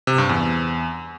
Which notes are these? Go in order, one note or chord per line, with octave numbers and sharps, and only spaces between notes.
C3
G2
E2